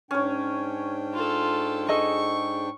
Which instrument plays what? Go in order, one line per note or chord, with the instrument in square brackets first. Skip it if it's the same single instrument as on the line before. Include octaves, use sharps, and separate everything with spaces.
[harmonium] G#2 D4 G5 [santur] C#4 C#5
[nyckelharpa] F4 A4
[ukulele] G#4 A4 D#5 [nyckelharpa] C#6